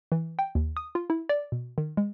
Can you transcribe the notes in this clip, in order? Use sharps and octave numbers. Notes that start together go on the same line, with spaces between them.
E3
G5
D#2
D#6
F4
E4
D5
B2
D#3
G#3